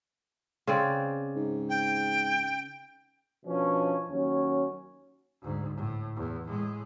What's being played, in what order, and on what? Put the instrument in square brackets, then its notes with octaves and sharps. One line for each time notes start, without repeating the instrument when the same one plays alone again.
[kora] C#3 C4 D5
[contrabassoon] G#2
[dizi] G5
[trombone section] B2 F3 C#4 D4
D#2 F#3 C#4
[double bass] D2 G#2
A2
E2
A2 G#3